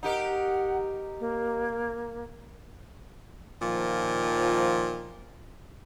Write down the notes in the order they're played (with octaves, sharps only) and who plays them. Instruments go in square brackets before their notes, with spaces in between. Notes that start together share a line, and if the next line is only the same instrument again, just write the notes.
[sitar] D#4 G4 A#4 [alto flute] F#5
[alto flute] A#3
[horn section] A#2 D#3 F3